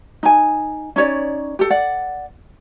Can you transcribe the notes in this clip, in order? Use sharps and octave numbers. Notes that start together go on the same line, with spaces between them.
D#4 G#5
C#4 D#4 C#5 D5
G4 A4
D5 F#5